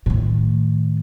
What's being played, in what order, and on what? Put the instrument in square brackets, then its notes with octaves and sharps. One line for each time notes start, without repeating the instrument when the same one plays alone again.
[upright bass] A2 D#3